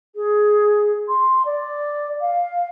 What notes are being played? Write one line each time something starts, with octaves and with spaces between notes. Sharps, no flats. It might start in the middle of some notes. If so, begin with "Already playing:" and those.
G#4
C6
D5
F5